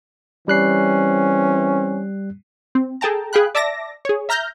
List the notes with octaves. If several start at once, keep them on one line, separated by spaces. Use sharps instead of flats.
E3 G3 C4 C#4 F#6 C7
C4
G#4 A4 G5 A5 A#5
G#4 F5 G5 B5 F#6
D5 E5 A5 D6 A#6
G#4 C#5
E5 A#5 F6 G6 A#6